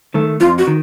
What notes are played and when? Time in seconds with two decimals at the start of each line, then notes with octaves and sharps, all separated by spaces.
0.14 D#3 A3
0.40 F2 F4
0.58 F#4
0.67 D#3